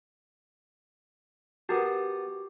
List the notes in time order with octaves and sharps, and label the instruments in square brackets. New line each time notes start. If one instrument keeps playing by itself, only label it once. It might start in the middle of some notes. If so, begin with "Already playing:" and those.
[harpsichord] B3 A#4 A5 [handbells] F#4 G4